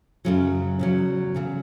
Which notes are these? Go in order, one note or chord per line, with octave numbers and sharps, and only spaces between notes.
F#2 C#3 F#3
E2 C#3 F#3
E2 C#3 F#3